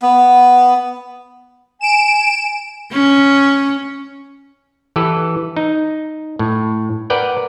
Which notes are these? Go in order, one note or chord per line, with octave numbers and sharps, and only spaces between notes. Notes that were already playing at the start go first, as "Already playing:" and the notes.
B3
G#5 D7 E7
C#4
E3 G4 A4 B4
D#4
A2
A#4 B4 D5 F#5 G5